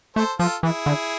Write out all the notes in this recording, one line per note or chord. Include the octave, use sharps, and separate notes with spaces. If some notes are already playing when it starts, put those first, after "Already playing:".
A3 A4 C5
F3 F4 A4
E3 E4 G#4
D3